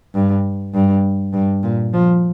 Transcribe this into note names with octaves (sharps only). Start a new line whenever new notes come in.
G2
G2
G2
A#2
F3